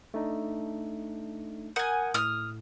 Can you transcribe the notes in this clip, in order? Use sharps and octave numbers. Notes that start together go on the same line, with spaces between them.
A3 D4 D#4
A#4 F#5 G#5 D#6 G6
A2 D#6 F6